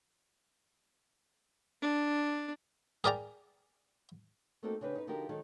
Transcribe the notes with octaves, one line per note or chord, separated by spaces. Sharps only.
D4
G#4 A#4 D5 G5 A#5
A3 A#3 C4 D#4 F#4 A4
C#3 C4 D4 G4 B4
D#4 B4
D3 F3 D#4 F#4 G4 A#4
D#3 F#3 G#3 A4